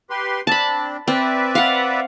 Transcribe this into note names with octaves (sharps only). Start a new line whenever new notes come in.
G4 B4 C6
C4 D4 A5 B5
C4 B4 D5 E5
F5 F#5